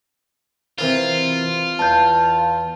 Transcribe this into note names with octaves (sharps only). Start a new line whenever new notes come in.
C3 E3 F4 A#4
E2 A5 G6